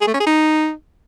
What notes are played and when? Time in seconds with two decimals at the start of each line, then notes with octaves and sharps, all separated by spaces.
0.01 G#4
0.07 A3
0.14 C#4
0.20 G#4
0.26 D#4